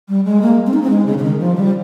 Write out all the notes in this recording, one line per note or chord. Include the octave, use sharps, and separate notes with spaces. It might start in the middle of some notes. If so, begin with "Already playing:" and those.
G3
G#3
A#3
C4
D#4
C4
G#3
C#3
C#3
D#3
F3
G3